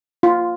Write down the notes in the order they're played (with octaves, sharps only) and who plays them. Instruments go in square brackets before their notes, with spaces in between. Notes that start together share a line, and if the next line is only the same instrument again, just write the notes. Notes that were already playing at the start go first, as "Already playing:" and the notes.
[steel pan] F4